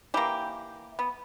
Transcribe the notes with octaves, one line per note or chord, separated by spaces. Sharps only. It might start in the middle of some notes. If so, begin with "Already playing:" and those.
E3 A#3 G4
B3